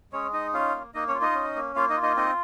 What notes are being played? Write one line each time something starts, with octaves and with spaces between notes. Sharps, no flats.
G#3 C#4 C#5
D#4 D#5
C#4 F4 F5
A#3
A#3 D#4 D#5
C#4 C#5
F4
D#4 D#5
C#4
A#3
A#3 F4 F5
D#4 D#5
F4
D#4 D#5
C4 D#4 D#5